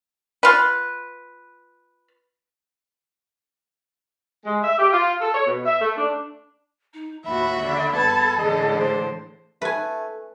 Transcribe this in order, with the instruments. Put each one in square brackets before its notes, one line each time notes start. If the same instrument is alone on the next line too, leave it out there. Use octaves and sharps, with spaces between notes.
[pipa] F4 B4
[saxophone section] G#3
E5
G4
F4
A4
C#5
B2
E5
A3
D4
[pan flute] D#4
[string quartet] D#2 A2 F#4 [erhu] E5 [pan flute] B5
[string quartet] D3
[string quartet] G2 A5 G#6 [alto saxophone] B3 [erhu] A4
[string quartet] A2 D3 E3 [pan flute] G#4 [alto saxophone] D#5
[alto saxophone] C5
[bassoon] A3 [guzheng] B4 G#5